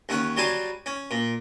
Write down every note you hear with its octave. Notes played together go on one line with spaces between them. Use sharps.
D#2 C#4 F#5
F#3 G3 G#5 A5 C6
C#4
A#2